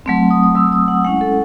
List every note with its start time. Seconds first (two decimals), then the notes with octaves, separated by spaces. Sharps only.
0.06 F#3 A3 C4
0.30 D#6
0.43 D#6
0.55 F#3 A3 C4 E6
0.72 D#6
0.88 F#5
1.04 G#3 C#4 E4 F#5
1.21 A4